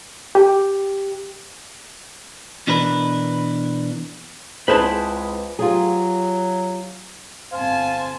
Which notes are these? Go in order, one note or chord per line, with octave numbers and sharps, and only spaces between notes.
G4
B2 E3 D4 A#4 B4
C#2 C4 E4 G#4 B4 C5 A5
F#3 F4 G4 G#4
G1 C4 C5 F5 G#5 A5